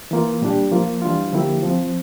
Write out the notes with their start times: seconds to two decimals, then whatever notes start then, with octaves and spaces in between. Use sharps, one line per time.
0.11 E3 A#3 F4
0.42 A#2 G3 D4 G4
0.72 F3 A#3 F4
1.02 E3 G3 D4 F4
1.33 D3 F3 A#3 E4 G4
1.63 F3 C4 F4